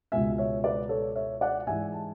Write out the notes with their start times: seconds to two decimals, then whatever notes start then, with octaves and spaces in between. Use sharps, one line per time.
0.12 C#2 B2 G#3 E5 G#5
0.38 C#5 E5
0.64 B4 D5
0.89 A4 C#5
1.15 C#5 E5
1.41 D5 F#5
1.67 G#2 E3 G#3 E5 G#5
1.92 A5